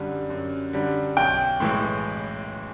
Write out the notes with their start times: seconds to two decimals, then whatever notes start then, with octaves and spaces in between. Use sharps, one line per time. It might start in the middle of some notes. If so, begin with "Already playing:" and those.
Already playing: F#2 D3 G3
0.30 F#2
0.73 D3 G3
1.17 B1 G5
1.60 A2 E3 G#3